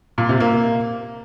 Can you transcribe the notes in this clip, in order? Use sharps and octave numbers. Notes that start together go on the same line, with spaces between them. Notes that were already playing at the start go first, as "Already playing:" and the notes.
A#2
C3
A#3